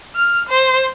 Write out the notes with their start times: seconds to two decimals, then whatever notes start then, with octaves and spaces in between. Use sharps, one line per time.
0.16 F6
0.49 C5